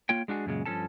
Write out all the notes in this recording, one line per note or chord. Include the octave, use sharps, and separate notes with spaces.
A#3 F4 C#5 G5
G#3 D4 F#4 G#4
F#2 A#2 C#3 G#3
G2 A#2 F3 C#4 A4 A5